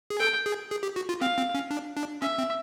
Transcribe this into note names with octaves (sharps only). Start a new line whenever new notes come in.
G#4
A4 G5
G#4
G#4
G4
F#4
F4
C4 F5
C4
C#4
D4
D4
C#4 E5
C4